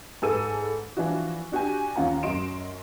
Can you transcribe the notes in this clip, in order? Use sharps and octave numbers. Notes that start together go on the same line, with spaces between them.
G#2 G#4 A4 B4 E6 D#7
E3 F3 D4 E4 F#4
D4 F#4 G4 G#5
D#2 C#4 F4 F#5 A#5
F#2 F#4 D#5 C6 D7 E7